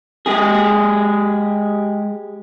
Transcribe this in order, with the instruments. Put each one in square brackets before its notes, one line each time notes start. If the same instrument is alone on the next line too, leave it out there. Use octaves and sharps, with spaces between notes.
[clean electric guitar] G#3 G4 G#4